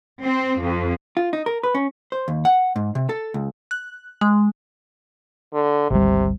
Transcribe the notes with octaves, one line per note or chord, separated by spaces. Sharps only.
C4
F2
F4
D#4
A#4
B4
C#4
C5
D#2
F#5
G#2
C3
A4
C#2
F#6
G#3
D3
G#1 D2 C3 G3